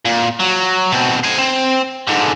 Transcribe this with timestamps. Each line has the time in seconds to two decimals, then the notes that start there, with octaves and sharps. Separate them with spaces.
0.05 A#2
0.39 F#3
0.92 B2 C4
1.24 C5 G#5
1.38 C4
2.07 G#2 D3